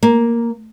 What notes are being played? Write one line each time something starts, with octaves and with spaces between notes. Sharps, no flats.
A#3